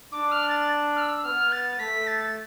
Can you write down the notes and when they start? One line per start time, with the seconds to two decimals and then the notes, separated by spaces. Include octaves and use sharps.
0.12 D4 D6
0.32 F6
0.49 A6
0.96 F6
1.01 E6
1.24 B3 F6
1.52 A6
1.79 A3 B6
2.07 A6